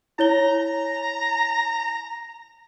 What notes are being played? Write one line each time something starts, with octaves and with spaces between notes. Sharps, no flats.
E4 C#5 A#5 G7